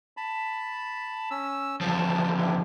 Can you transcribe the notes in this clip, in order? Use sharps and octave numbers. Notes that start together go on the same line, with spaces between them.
A5 B5
C#4 E6
E2 F3 A5
D4 E4 G4